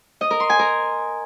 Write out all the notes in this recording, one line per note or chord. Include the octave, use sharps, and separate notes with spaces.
D#5
A#4
C6
G#5
A#4